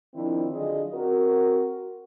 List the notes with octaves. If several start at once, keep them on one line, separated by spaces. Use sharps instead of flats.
D#3 F3 C4 D4 E4
D3 F#3 D4 F4 G#4 D#5
C4 F#4 A#4